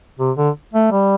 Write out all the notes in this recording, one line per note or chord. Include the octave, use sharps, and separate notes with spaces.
C3
D3
A3
G3